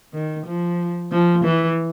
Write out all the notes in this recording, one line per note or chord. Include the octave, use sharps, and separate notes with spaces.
D#3
F3
F3
E3